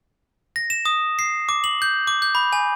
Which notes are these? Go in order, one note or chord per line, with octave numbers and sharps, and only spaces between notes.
A#6
E7
D#6
C7
D6
F#7
G6
D6
G6
B5
G#5